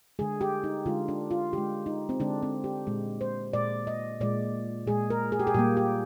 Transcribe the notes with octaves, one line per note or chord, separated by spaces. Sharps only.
D3 G#3 G#4
G4
D#4
D3 G#3 F4
D4
F4
D3 G#3 G4
D#4
C4
D3 G#3 D4
C4
G4
A#2 G#3
C5
A#2 G#3 D5
D#5
A#2 G#3 D5
A#2 G#3 G#4
A#4
G#4
G4
G#4
A#2 G3 A#3 G4
G4